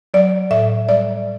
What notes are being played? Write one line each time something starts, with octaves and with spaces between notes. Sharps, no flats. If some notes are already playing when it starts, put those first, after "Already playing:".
F#3 D5
A2 E5
G3 D5